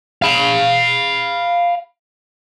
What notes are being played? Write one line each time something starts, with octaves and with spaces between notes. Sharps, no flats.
F5 B5